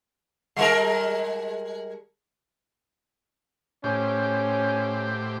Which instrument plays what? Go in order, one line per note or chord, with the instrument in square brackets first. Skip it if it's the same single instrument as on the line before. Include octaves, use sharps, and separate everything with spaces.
[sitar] G3 G#3 A#4
[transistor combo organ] A2 G4 C5 [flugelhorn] C#4